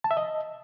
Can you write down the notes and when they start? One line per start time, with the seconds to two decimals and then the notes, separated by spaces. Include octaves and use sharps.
0.04 A5
0.11 E5
0.17 D#5